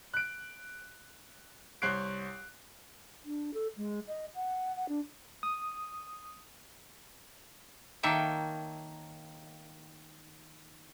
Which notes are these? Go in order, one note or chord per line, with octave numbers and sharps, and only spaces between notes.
F#6 D7
C2 C5 C#5 F#6 C7 D7
D4
A4
G#3
D#5
F#5
F#5
D4
D#6
D#3 A#3 C#5 E5 G5 A5